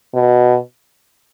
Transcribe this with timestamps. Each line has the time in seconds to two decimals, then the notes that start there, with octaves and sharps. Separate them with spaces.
0.15 B2